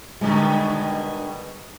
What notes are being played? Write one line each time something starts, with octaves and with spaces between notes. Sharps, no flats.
B2 D3 D#3 G3 G#3